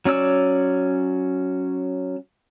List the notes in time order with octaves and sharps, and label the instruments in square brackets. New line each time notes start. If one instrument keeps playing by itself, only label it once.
[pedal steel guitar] F#3 C#4 D5 E6